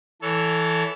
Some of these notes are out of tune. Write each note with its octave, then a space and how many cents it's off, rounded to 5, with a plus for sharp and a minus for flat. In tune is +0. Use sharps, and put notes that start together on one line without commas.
E3 +0 A4 +0 C#5 +30